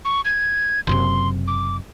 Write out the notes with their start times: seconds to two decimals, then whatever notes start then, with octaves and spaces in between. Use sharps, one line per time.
0.05 C#6
0.25 G#6
0.87 F#1 F#2 C3 C6
1.48 D6